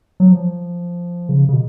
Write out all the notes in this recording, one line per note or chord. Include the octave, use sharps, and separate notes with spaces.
F#3
F3
C#3
C#3
B2